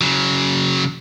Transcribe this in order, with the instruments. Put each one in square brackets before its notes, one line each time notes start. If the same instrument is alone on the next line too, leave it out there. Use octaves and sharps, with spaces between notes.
[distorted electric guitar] C#3 F#3